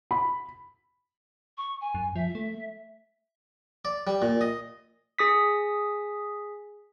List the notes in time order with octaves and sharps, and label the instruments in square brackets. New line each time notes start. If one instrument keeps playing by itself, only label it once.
[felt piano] B5
[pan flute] C#6
G#5
[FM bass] F#2
[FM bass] F3 [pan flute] E5
[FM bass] A3
[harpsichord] D5
G3
A#2
D#5
[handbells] G#4 D#6 B6